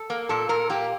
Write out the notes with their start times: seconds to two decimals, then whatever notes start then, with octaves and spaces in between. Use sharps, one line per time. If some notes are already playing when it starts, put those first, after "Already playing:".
Already playing: A4
0.10 A#3
0.29 A#2 A4
0.49 A#2 A#4
0.70 A#3 G4